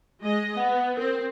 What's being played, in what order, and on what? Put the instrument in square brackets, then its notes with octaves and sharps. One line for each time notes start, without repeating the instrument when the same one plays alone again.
[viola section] G#3 D#5
[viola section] B3 [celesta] F#5
[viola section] C4 [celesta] A#4